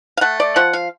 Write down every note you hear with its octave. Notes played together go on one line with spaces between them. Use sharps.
F5
A3 F#5
D5
F3 F#5
F5